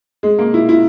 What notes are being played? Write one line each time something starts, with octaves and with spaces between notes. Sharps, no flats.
G#3
A#3
E4
E4